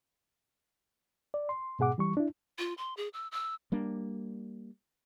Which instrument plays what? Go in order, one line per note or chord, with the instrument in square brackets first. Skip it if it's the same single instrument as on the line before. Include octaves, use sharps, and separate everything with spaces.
[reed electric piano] D5
C6
G#2 B2 G#4 F#5 D6
E3 G3 C#6
D4 E4
[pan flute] F4
C6
G#4
E6
E6
[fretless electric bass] G3 A#3 D4